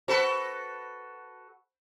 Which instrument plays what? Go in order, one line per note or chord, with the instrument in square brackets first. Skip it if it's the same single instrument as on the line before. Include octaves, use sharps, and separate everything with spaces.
[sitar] F#4 A4 B4 [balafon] C5